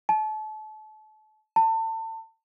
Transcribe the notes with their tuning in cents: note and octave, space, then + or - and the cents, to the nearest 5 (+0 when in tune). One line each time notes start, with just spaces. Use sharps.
A5 -30
A5 +30